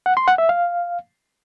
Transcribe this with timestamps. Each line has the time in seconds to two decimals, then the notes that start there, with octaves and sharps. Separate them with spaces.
0.06 F#5
0.17 C6
0.28 F#5
0.38 E5
0.49 F5